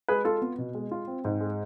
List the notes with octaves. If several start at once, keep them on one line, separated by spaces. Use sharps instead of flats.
G#3 G#4 B4
F4 A4
B3
B2
G#3
F4
C4
G#2
G#3